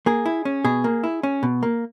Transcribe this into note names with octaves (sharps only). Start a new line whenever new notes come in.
A#3 G#4
E4
C#4
B2 G#4
A#3
E4
C#4
B2
A#3